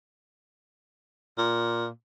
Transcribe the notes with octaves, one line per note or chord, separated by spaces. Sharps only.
A#2